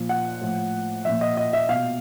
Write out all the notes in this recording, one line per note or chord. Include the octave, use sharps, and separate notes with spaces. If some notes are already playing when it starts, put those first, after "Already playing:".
Already playing: A#2 F3
F#5
A2 F3
A#2 F3 E5
D#5
D#5
E5
B2 F5